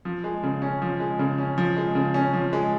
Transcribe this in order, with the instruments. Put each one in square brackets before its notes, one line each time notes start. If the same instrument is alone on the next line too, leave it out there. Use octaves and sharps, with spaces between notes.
[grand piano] F3
G#3
C#3
C#4
F3
G#3
C#3
C#4
F3
G#3
C#3
C#4
F3
G#3